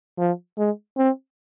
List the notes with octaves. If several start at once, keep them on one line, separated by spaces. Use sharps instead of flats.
F3
G#3
C4